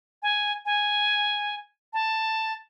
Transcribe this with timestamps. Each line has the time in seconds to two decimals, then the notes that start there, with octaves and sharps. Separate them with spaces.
0.23 G#5
0.65 G#5
1.93 A5